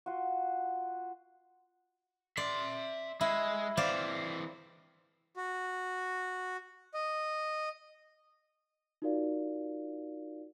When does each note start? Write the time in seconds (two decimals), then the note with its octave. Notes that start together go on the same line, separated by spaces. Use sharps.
0.06 F4 F#4
2.37 D5 E5 C6
3.21 G#3 E4
3.77 E3 C4 C5 D5 F5
5.37 F#4
6.94 D#5
9.02 D#4 F4 F#4 A#4 D5 F5